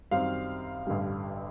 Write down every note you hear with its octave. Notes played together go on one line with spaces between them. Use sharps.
F#2 D#3 G3 C4 F5
A1 G2 D3 G3